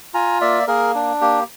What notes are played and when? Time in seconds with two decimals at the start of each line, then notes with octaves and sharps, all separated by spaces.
0.14 F4 G#5 A#5
0.41 A#3 D5 E5
0.67 A#3 G#4 A#4
0.95 D4
1.21 A#3 G4